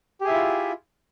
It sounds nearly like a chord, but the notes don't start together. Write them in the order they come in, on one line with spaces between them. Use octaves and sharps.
G4 G#4 E5 E4 F4